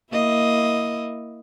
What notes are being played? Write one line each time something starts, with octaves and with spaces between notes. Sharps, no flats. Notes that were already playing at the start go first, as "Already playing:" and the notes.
A#3 E4 D#5